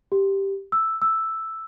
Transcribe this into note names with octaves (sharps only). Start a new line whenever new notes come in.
G4
E6
E6